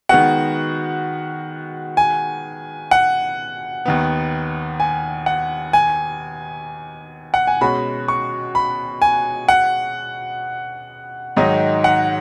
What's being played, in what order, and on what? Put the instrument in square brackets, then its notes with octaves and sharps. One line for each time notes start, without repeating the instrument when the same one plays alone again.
[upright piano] D#3 G#3 B3 F#4 [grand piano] F#5
[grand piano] G#5
F#5
[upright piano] D#2 D#3 B3
[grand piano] G#5
F#5
G#5
F#5
G#5
[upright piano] B2 G#3 C#4 F#4 [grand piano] B5
[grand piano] C#6
B5
G#5
F#5
[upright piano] G#2 D#3 F#3 D#4 [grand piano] D#5
[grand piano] F#5